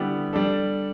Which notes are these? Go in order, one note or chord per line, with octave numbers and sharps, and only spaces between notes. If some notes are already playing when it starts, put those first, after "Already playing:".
Already playing: D3 G3 B3 E4 G4
G3 D4 A4